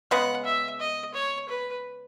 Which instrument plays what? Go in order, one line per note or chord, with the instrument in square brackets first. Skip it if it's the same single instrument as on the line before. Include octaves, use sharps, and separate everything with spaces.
[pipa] C#3 G#3 B3 [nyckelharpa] F#5
[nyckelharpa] E5
D#5
C#5
B4